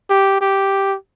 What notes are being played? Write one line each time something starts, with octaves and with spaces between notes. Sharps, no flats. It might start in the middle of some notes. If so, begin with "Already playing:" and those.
G4
G4